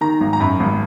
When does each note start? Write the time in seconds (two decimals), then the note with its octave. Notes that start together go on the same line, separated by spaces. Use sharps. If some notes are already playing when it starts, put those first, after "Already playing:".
0.01 D#3 A#5
0.21 G#1
0.33 A#5
0.40 F#2 B5
0.60 G#1